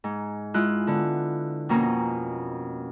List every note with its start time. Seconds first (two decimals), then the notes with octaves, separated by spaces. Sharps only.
0.04 G#2
0.54 G#3 E4 F4 F#6
0.87 D3 B3
1.69 F2 B2 A#3 C#4 A#5